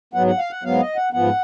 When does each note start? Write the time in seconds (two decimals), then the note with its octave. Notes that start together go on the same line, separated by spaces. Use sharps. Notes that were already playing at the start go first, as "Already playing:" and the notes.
0.13 G#2 F#3 B3 F#5
0.27 F#5
0.38 F5
0.51 F#5
0.63 G#2 F#3 B3 F5
0.80 D#5
0.96 F#5
1.13 G#2 F3 B3 F#5